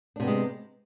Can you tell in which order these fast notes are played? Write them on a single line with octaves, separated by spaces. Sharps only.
D4 C3 B3 G#3